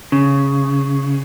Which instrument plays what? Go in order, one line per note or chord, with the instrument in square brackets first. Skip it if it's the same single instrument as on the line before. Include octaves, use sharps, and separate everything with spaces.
[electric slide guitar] C#3